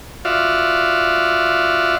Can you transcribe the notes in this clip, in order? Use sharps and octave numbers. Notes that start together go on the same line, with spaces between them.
F4 F#4 D5 E5 F5